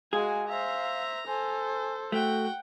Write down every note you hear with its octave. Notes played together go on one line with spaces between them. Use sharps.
G#3 F#4 G#4 F5 G#5
C5 E5 F5 A#5
A4 C5 G#5
A3 F#4 F#5 G5